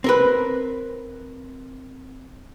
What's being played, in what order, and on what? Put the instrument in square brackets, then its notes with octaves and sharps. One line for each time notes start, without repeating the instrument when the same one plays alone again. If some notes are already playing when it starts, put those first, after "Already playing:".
[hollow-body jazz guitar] C4 A#4 B4